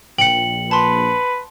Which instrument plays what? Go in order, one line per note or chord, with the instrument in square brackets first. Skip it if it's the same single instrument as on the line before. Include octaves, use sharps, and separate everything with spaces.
[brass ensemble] A#1 [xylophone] G5 [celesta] C#7 F#7
[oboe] B4 [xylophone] A5 C6